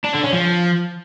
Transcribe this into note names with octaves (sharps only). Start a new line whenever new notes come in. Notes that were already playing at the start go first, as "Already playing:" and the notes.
D4
D3
C#4
F3